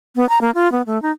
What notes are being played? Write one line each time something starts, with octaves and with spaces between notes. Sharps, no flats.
B3
A#5
A#3
F4
B3
A3
D#4